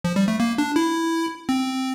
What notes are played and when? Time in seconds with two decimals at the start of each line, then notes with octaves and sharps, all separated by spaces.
0.04 F3
0.16 G3
0.28 A3
0.40 A#3
0.58 D4
0.76 E4
1.49 C4